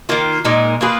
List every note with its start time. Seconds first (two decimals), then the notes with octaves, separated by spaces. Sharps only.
0.09 D#3 A#3 F4
0.45 A#2 G#3 D#4 A#4
0.81 A#3 F4 G#4 B4